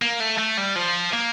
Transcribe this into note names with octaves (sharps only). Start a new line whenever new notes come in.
A#3
A3
A3
G3
F3
A#3